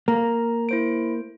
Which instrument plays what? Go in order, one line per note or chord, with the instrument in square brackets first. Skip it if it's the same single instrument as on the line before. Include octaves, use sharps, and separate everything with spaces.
[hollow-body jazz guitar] A#3 [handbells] A#5
[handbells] E4 C5 D7